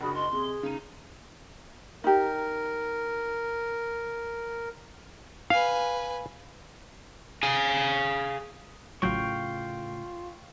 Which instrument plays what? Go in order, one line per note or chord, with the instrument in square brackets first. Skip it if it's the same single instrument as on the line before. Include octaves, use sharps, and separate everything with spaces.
[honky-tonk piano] F#1 D4 F#4 [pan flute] G#4 [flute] B5
[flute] D#5 [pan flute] C6
[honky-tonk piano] C3 [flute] G#4
[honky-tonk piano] C#3 D#7 [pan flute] D#4
[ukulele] D#4 G4 [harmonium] A#4
[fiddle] B4 G#5 [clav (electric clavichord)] F5
[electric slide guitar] G#4 F5 G#5
[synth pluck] A1 F#3 [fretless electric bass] A2 C#3 [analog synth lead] F4 [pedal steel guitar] F5 G5 C#6